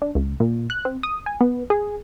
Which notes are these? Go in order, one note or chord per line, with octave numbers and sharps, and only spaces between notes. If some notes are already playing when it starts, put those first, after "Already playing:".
D4
C#2
A#2
F#6
C4
D#6
G#5
B3
G#4